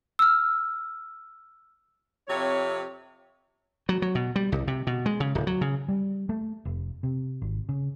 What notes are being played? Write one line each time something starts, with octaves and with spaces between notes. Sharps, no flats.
E6 F6
F2 C3 C#5
F#3
F#3
B2
G3
C2
C3
B2
G#3
C#3
D1
F#3
C#3
G3
A3
F1
C3
G#1
C#3